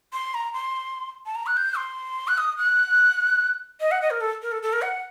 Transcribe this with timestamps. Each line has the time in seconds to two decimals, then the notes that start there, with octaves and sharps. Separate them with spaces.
0.13 C6
0.34 A#5
0.53 C6
1.26 A5
1.35 A#5
1.46 F#6
1.57 G6
1.77 C6
2.28 F#6
2.38 D#6
2.58 F#6
3.80 D#5
3.91 F#5
4.01 D#5
4.10 A#4
4.21 A4
4.42 A#4
4.52 A4
4.62 A4
4.73 A#4
4.82 F#5